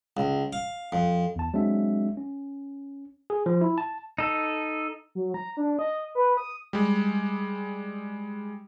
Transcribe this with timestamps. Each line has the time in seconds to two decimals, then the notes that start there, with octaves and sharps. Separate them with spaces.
0.17 C#2
0.53 F5
0.92 F2
1.36 E2 A5
1.54 F#3 G#3 C4 D4 E5
2.17 C#4
3.30 G#4
3.46 F3
3.61 E4
3.78 A5
4.18 D#4 A4
5.15 F#3
5.34 A#5
5.57 D4
5.79 D#5
6.15 B4
6.37 D#6
6.73 G3 G#3